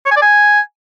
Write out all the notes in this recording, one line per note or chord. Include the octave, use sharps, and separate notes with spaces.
C#5
G#5
D5
G#5